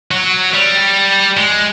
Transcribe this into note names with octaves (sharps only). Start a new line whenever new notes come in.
F#3
G3
G#3